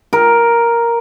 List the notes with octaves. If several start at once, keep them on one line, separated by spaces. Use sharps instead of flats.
A#4